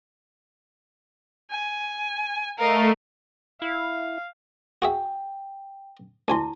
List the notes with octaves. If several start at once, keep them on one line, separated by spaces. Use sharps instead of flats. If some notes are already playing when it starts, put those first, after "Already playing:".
G#5
A3 A#4 D#5 F5
E4 F5
F#4 G#4 E5 G5
D2 E4 G#5 A5 C6